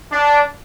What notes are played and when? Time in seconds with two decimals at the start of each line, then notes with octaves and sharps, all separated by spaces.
0.12 D4